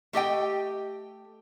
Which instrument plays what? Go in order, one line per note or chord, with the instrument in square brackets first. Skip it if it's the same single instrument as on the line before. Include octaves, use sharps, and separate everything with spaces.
[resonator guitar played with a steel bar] A3 G4 D#5 G5